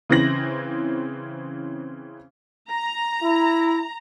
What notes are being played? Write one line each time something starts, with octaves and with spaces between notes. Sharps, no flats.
C#3 E3 C4 A#6 F#7
A#5
E4